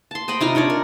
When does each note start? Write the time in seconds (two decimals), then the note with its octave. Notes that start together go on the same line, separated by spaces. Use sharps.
0.11 A5 C6
0.28 C5 D#5 G5 B5
0.40 C3 D#4 F4 A#5
0.55 D4 D#4 C#5 D5
0.70 A#4